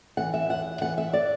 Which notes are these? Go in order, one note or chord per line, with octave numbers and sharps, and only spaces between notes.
E3 F#5
E5
E2 F#5
E3 F#5
E5
D5